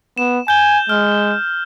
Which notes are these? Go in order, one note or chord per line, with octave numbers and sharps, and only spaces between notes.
B3 E7
G#5 G6 G7
G#3 F6